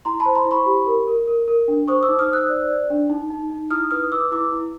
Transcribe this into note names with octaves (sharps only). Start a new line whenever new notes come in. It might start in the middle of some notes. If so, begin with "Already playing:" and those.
E4 A#5 C6
A5 B5
C5
A#5 C6
E4
B5 C#6
G4
A#4
A#4
A#4
A#4
D4
C5 C#6 D#6
D6 E6
D#4
D#6 F6
C5 E6 F#6
D5
D5
D4
D#4
D#4
D#4
E4 D#6 F6
B4 D#6 F6
B4 D6 E6
E4 D6 E6
E4